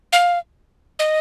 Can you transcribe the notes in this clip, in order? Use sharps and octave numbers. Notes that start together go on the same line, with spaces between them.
F5
D#5